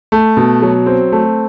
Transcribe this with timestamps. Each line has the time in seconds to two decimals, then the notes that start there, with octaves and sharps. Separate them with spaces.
0.12 A3
0.37 B2
0.62 F#3
0.86 C4
1.12 A3